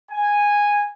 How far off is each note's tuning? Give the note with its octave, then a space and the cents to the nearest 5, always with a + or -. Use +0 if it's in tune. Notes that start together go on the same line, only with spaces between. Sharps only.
G#5 -10